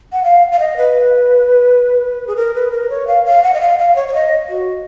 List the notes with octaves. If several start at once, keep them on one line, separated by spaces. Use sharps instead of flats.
F#5
F5
F5
D#5
B4
G#4
A#4
B4
A#4
C#5
F5
F5
F#5
D#5
F5
F5
C#5
C#5
D#5
F#4